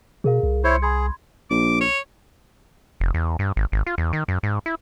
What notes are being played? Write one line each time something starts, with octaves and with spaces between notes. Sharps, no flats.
B2 G#4 A#4 F5
C2
E4 C5 C#5 C6 C#7
G#4 B5 C6 G#6
A#1 D6
C#5
F1
E2
G2
G#1
G#1
F4
E2
D#3
F#2
G#2
E4